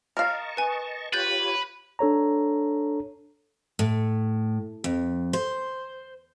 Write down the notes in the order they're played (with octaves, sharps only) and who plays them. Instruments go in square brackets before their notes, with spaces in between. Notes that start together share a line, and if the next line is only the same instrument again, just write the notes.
[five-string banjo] A#4 F5 [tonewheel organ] D#5 A5 C#6
[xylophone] B4 G#5
[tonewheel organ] F4 G4 C#5 [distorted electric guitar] B4 [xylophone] G6 A6
[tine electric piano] D4 A4 C#5 A#5
[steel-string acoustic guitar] A2
F2
C5